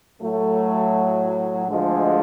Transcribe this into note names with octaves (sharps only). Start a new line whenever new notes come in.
A2 F#3 A3
D2 D3 F3 G#3